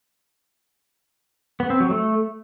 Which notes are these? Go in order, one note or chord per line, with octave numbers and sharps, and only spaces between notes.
B3
C4
F#3
A3